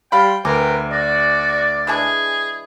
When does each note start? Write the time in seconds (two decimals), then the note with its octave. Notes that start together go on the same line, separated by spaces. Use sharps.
0.12 G3 F5 G5 B5 C6
0.45 D2 C4 A#4 B4 G5 G#5 D6
0.91 F#4 D5
1.87 E3 G#3 D4 G#4